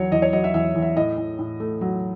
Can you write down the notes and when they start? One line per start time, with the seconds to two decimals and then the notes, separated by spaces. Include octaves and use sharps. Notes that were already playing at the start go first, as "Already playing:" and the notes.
Already playing: E2 F#3 C#5
0.12 E2 D#5
0.22 C#5
0.33 F#3 D#5
0.44 E5
0.54 E2 E5
0.75 E2
0.82 E5
0.96 A2 D#5
1.18 A2
1.39 A2
1.60 A3
1.81 F#3